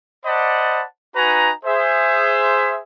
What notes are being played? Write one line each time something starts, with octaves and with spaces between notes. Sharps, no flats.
C5 D5 D#5 F#5 A5 B5
D#4 F#4 B4 G#5 A#5
G#4 C5 E5